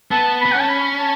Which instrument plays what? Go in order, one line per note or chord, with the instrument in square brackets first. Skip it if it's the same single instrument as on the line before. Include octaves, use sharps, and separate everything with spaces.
[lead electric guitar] B3 [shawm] A5
[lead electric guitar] B3 [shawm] B5
[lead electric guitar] C#4 [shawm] F#5
[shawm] A5
B5
A5